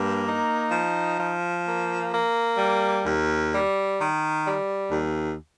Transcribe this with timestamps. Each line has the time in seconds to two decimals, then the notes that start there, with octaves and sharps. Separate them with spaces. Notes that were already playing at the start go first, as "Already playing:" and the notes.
Already playing: G2 A#3
0.25 D#4
0.71 F3
1.18 F3
1.65 A#3
2.11 A#3
2.58 G3
3.04 D#2
3.51 G3
3.98 D#3
4.44 G3
4.91 D#2